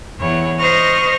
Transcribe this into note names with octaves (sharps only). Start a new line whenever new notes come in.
E2 C#5 F#5
C5 D#5 C#6 F6 A#6